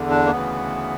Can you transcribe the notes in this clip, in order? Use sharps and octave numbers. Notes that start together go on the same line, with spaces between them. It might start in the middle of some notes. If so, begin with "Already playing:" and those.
Already playing: E2 D3
D4
A#3
D2 C#3 E3 B3